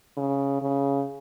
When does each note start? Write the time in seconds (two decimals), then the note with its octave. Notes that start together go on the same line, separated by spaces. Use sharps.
0.17 C#3
0.62 C#3